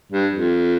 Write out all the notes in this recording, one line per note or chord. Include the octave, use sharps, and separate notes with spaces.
G2
F2